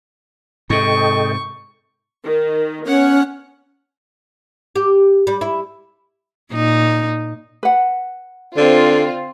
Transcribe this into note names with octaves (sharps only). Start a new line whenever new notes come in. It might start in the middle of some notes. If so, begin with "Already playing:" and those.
G#2 C3 A4 D#5 G5 C#6
D#3
B3 C#4 C#5 F#5
G4
G3
E4
A#2 D#4
B4 F#5
D3 C4 F4 C5